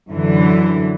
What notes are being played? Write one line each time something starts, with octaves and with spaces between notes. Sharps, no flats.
F#2 D3 E3